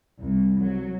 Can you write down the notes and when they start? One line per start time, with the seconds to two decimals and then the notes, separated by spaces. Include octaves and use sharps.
0.20 C2
0.62 F#3